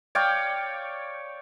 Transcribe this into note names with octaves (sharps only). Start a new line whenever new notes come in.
C#5 D5 F5 G5